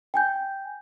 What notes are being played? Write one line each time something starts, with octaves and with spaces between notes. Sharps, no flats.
G5 G#5 G6